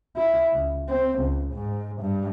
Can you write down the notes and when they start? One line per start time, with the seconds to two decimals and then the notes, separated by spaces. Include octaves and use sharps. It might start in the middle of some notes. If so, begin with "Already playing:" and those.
0.16 E4
0.53 C#2
0.89 C4
1.19 C#2
1.54 G#2
2.01 G2